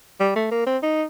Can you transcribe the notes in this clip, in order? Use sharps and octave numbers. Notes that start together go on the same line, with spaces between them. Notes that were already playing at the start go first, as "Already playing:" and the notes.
G3
A3
A#3
C4
D#4